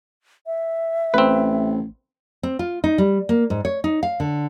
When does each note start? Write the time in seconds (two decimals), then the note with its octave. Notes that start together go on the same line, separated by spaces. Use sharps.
0.47 E5
1.14 A1 C4 B4
2.43 C4
2.59 F4
2.84 D#4
2.98 G3
3.29 A#3
3.50 G#2
3.65 C#5
3.84 D#4
4.03 F5
4.20 D3